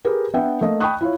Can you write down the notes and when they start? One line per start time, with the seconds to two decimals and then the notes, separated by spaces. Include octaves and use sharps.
0.05 G4 G#4 A#4 B4
0.34 B3 D4 E5 F#5 G5
0.61 A3 A#3 D#5
0.80 G5 A5 B5 C#6 D#6 F#6
1.01 E4 F4 C#5